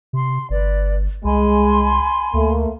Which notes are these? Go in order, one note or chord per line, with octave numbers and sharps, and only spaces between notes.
C3 C6
G1 B4 D5
C2 G#3 G#5 B5 C6
D2 A3 A#3